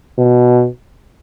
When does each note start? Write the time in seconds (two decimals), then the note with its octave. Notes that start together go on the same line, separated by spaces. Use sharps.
0.18 B2